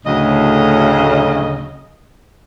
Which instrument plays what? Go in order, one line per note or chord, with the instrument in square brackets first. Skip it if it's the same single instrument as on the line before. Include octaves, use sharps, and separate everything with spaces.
[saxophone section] D2 A2 C#3 F#3 D#5